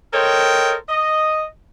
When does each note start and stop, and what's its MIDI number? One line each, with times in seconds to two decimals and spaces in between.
0.13 0.75 69
0.13 0.75 70
0.13 0.75 72
0.13 0.75 73
0.13 0.75 75
0.13 0.75 79
0.89 1.44 75